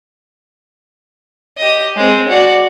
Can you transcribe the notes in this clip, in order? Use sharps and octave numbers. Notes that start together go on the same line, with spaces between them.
G4 D#5
G#3 C4
F#4 D5